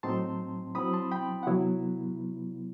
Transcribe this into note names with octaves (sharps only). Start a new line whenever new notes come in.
A2 F#3 C4 D#4 A5 C6
F#3 C4 E4 B5 D#6
A5 C6
G5 B5
F#5
C3 F#3 B3 E4